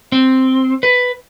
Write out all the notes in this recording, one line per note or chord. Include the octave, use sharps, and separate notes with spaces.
C4
B4